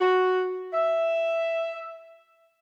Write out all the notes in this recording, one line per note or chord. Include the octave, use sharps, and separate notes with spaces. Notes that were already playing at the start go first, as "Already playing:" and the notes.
F#4
E5